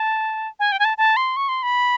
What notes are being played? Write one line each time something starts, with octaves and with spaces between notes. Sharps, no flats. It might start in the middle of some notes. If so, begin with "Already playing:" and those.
Already playing: A5
G#5
G5
G#5
A5
A5
C6
C#6
C6
B5